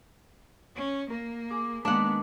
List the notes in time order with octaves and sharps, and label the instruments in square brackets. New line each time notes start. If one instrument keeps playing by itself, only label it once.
[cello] C#4
[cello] A#3 [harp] A#4
[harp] G#4 D6
[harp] D#3 G#3 A#3 [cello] B3 [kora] D4 F#5